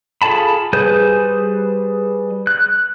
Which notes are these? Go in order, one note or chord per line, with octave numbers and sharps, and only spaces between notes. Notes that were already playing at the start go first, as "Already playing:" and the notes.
F4 G#4 A4 A5 B5
G3 G#4 B4 C5 G6
F#6